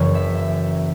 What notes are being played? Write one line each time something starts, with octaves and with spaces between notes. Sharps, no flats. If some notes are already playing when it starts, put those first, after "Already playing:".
Already playing: F#1 F#2 E3 C#5
E5
E5